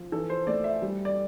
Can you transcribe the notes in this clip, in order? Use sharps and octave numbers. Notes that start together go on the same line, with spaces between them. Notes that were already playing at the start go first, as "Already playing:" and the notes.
Already playing: F3
E3 A4
C5
A3 D5
E5
G3
D5